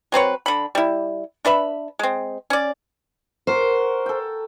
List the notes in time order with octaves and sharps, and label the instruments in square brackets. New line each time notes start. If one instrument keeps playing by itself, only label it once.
[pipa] F#3 C4 B4 C#5
D3 B5
G3 E4
D4 B4 E5 B5
G#3 C4
C#4 D5
[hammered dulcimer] F#4 A#4 [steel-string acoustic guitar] C5
[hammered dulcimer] A4 G5